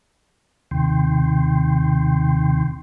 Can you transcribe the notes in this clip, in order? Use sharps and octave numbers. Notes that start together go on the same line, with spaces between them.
D#2 C3 D#3 G5 C6